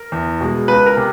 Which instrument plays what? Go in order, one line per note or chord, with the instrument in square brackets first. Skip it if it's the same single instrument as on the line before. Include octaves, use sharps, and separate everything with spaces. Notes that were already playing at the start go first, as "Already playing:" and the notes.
Already playing: [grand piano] A#4
E2
B2 G#3
C#2 B4
A#4
C3